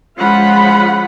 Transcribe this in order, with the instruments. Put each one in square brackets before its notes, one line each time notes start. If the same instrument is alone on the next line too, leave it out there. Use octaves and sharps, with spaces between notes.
[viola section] F3 G#3 C#4 F4 F#5 B5